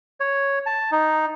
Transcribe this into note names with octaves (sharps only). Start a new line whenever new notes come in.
C#5
A5
D#4